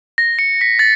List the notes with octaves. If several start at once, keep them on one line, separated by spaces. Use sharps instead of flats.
A#6
C#7
B6
A6